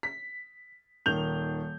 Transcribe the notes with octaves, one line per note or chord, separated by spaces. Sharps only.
B6
D#1 D#3 G6 F7